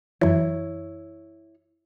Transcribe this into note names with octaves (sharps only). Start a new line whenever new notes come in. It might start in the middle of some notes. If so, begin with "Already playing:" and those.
F#2 E3 E4 C#5